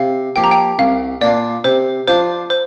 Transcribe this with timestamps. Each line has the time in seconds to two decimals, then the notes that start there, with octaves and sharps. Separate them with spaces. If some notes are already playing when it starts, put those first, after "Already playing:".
Already playing: C3 F5
0.36 F3 A#3 G4 G5
0.44 A#5
0.51 G5
0.79 C2 F5
1.21 A#2 A#3 D4 F4 D5
1.64 C3 C5
2.07 F3 D4 F4 C5
2.50 C5